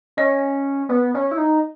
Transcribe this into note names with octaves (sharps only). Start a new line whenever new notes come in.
C#4 D#5
B3
C#4
E4
D#4